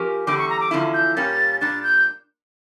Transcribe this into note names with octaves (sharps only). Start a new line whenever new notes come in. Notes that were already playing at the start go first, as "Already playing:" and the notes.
Already playing: F3 C#4 G4 A#4
E2 D3 G3 D6
C#6
A#5
D6
E2 D3 F3 C#4 E4
G6
A#2 G3 A#3 C#4 G4 A6
A#2 G3 D4 A6
G6